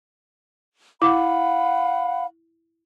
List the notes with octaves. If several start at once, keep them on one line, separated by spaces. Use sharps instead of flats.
E4 F5 F#5 B5 D6